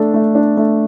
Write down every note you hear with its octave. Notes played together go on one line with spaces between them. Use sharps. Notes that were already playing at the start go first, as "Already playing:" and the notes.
Already playing: A3 D4 A4
A3
D4
A3